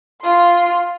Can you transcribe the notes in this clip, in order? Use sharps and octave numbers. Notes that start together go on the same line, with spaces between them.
F4 C6